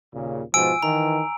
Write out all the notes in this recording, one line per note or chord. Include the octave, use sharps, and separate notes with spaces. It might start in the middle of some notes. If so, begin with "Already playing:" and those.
D#2 A#2 C#3
G#2 B2 F3 G#5 E6 D7
D#3 E3 A#5